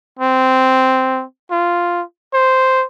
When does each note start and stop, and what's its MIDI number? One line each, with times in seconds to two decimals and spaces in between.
0.19 1.24 60
1.51 2.03 65
2.34 2.85 72